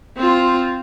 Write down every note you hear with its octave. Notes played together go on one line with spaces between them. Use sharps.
C4 F4